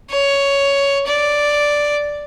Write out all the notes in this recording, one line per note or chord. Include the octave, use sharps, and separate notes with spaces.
C#5
D5